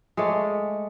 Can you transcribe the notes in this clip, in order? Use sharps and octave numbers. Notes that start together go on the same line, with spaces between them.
G#3 A3 C#5 D5